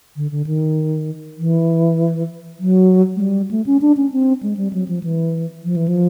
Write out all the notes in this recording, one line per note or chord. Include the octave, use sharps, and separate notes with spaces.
D3
D3
D#3
E3
F#3
G#3
G3
A3
C#4
D4
C#4
C4
G#3
G3
F#3
F3
E3
F3
E3
F3